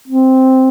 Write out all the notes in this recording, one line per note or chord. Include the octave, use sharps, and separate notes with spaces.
C4